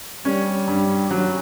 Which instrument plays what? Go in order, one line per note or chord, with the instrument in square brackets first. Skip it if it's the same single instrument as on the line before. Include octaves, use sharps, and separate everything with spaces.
[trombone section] G3 [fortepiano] C#4
[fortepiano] G2
[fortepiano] F#3 [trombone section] C#4